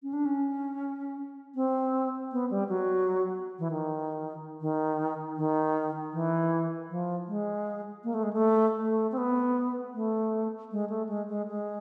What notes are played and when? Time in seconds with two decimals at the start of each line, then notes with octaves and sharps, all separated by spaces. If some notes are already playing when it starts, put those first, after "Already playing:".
0.03 C#4
0.13 D4
0.25 C#4
1.55 C4
2.32 B3
2.51 G3
2.69 F#3
3.59 E3
3.71 D#3
4.61 D#3
5.37 D#3
6.13 E3
6.89 F3
7.28 G#3
8.04 A#3
8.14 A3
8.23 G#3
8.33 A3
8.80 A3
9.12 C4
9.18 B3
9.94 A3
10.72 G#3
10.90 A3
11.09 G#3
11.29 G#3
11.48 G#3